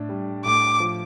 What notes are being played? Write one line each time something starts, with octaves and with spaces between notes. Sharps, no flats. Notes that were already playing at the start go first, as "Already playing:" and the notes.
Already playing: A2 D4
G3
A2 D6
F3